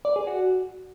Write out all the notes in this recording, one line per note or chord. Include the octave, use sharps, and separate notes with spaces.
D5
G#4
F#4